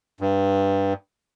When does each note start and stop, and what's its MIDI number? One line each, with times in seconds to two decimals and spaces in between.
0.21 0.93 43